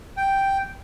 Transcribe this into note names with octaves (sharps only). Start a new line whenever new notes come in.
G5